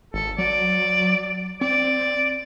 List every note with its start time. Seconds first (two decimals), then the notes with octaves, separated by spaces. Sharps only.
0.14 G#1 A4
0.38 F#3 D5
1.61 C4 D5